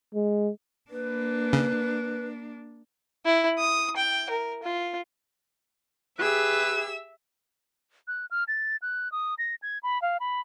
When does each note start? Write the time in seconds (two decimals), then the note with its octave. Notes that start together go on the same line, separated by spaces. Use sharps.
0.14 G#3
0.90 A#3 D4 B4
1.53 C#3
3.26 E4
3.58 D#6
3.96 G5
4.30 A#4
4.63 F4
6.19 G4 G#4 B4 E5 E6
8.08 F#6
8.31 F6
8.48 A6
8.82 F#6
9.12 D#6
9.38 A#6
9.62 G#6
9.83 B5
10.02 F5
10.20 B5